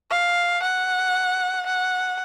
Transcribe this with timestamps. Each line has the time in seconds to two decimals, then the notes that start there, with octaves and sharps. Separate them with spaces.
0.11 F5
0.62 F#5
1.66 F#5